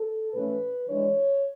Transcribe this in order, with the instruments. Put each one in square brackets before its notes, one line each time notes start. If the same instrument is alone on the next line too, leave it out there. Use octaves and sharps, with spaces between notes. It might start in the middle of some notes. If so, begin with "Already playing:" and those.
Already playing: [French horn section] A4
A2 E3 A3 C#4 B4
E3 G#3 D4 C#5